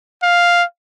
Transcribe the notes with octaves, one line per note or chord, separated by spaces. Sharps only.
F5